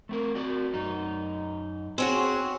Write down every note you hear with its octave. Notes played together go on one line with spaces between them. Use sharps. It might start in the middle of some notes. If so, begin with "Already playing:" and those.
A3 C4 A#4
C4 F#4 D5
F#2 D#4
C4 C#4 F#4 G#4